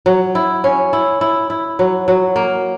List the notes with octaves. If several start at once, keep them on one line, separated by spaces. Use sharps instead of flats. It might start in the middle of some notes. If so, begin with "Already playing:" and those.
F#3
E4
C#4
E4
E4
E4
F#3
F#3
A#3